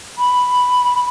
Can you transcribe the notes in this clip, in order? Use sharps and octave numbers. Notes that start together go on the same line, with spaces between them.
B5